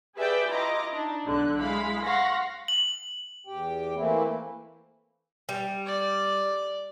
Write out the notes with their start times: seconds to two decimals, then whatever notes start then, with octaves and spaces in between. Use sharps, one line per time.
0.16 G4 G#4 B4 D5 E5 G5
0.49 E4 F4 D#5 A#5 D6
0.92 D4 D#4
1.25 B1 D3 F#6
1.59 G#3 E4 F5 B5 B6
2.04 F5 F#5 C6 C#6 A#6 B6
2.68 F#7
3.47 E2 G4 G5
3.96 E3 A3 A#3 C4 E4
5.49 G3
5.86 D5